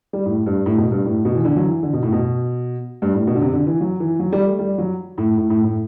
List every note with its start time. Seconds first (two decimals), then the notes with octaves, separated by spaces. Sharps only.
0.13 G3
0.26 A2
0.46 G2
0.66 A2
0.78 B2
0.92 G2
1.05 A2
1.25 B2
1.35 E3
1.45 D3
1.56 F#3
1.64 E3
1.83 D3
1.93 B2
2.03 A2
2.12 B2
3.02 G2
3.14 A2
3.27 B2
3.35 D3
3.41 C3
3.53 D3
3.67 E3
3.81 F#3
4.00 E3
4.20 F#3
4.33 G3
4.46 A3
4.59 G3
4.78 F#3
5.18 A2
5.37 A2
5.50 A2
5.64 A2